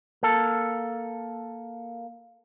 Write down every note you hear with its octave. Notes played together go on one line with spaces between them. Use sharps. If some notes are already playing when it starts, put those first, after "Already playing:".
A#3 A4